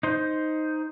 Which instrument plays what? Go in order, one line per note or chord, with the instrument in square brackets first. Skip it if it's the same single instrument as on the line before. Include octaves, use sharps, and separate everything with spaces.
[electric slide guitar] D#4 C5